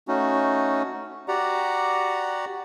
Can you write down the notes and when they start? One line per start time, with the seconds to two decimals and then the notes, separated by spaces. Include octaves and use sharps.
0.08 A3 C#4 D#4 F#4
1.28 F#4 G4 D5 F#5 A#5